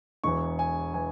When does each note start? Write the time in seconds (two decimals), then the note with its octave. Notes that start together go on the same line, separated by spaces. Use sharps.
0.24 E1 E2 E3 C#6
0.59 G#5
0.94 E3 G#5